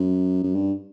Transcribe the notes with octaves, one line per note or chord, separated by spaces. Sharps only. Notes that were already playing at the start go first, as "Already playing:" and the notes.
Already playing: F#2
F#2
G2